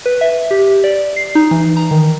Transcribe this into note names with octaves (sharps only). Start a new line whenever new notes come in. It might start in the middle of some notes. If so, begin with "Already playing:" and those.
B4
E5
G4
D5
C7
D#4
E3
A#5
D#3